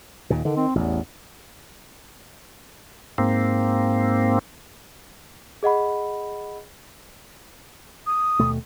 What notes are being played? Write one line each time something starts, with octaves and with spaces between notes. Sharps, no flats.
D#2 A#2
D3 D#3
C4
A1 E2
G#2 A#3 C4
G#4 D#5 F#5 B5
D#6
D#2 B2 A3